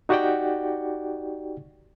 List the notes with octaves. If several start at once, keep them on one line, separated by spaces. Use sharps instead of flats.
D#4 F#4 G4 D5 F#5 G5